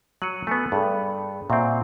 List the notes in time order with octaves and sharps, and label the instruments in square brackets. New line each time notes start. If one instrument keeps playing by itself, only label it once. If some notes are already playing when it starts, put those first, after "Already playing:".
[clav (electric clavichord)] F#3 [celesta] C#7 D#7 F#7
[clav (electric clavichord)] A3 B3 [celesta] G#5 C#7
[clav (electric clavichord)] G2 [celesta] G#4 A4 B5
[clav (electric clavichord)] A#2 C4 [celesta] E5 F#5 C#6